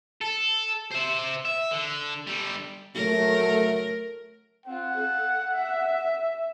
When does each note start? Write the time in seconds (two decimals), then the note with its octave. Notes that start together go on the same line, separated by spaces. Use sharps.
0.21 A4
0.91 C5 E5
1.45 E5
1.71 D3
2.27 D3 G3
2.95 F#3 A3 A#4
4.66 C4 F4 F#5
4.97 A4 F5
5.50 E5